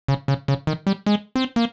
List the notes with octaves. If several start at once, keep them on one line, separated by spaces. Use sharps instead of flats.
C#3
C#3
C#3
D#3
G3
G#3
C4
A#3